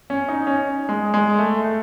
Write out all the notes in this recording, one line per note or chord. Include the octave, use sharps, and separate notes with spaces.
C#4
D#4
C#4
G#3
G#3
A3
A3